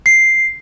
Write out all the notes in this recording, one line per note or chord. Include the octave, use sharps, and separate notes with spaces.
C7